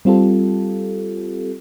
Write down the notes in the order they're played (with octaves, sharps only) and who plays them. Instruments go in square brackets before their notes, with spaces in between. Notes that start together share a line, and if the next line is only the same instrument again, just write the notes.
[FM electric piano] G3 C4 F4 G4 A4